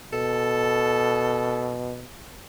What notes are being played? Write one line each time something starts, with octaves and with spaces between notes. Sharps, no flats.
B2 A4